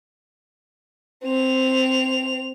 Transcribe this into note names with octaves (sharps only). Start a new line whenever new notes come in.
C4 F7